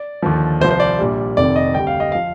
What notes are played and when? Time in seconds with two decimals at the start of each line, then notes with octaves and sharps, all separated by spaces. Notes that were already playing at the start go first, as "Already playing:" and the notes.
Already playing: D5
0.22 D#2 D3 F3
0.60 C2 C3 F3 C5
0.71 C5
0.80 D5
0.99 A#1 A#2 G3
1.37 F1 F2 C3 D#3 D5
1.56 D#5
1.74 D2 C3 G3 G5
1.87 F5
2.00 D#5
2.12 F3 F5